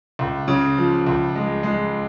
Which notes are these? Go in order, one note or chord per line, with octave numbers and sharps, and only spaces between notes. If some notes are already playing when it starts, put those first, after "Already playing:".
C#2
C#3
F3
C#2
G#3
G#3